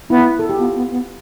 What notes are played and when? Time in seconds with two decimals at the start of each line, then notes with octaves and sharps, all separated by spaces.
0.10 B3 E4
0.39 A4
0.49 G4
0.58 B3 F4
0.75 B3
0.91 B3